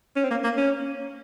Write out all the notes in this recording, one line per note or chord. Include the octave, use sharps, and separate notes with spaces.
C#4
C4
A#3
A#3
C#4